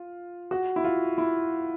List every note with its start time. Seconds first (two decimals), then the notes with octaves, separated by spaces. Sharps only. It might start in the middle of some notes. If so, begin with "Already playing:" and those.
Already playing: F4
0.51 F#4
0.76 E4
0.84 F4
1.18 E4